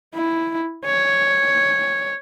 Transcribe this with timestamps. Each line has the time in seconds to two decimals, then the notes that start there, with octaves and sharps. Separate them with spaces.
0.15 E4
0.86 C#5